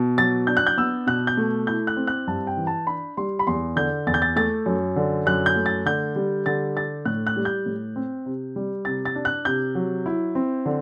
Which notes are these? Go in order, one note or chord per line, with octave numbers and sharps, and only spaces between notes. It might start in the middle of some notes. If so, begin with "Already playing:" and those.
Already playing: B2
F#3 A6
D4 G6
F#6
G6
B3 E6
B2 F#6
G6
A3
E4 G6
F#6
C4
F#6
G2 A5
G5
E3
A5
D4 B5
G3 C6
B5
E2 C6
D3 G6
E2 A6
G6
A6
A3 A6
F#2
D3
F#2 F#6
G6
A3
A6
D3 G6
G3
D3 A6
D4 A6
A2 F#6
F#6
G3
G6
A2
C4
C3
G3
C3 A6
A6
D4
F#6
C3 G6
F#3
E4
C4
D3